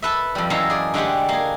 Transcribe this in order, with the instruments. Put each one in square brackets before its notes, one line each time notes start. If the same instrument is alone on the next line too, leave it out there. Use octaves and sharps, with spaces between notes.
[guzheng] A4 B4 E5
F2 G3
F#2 E3 G#3 A4 F5 A#5
G#4 D5
D3 G#3 A3 D4 G4
A#3 G#4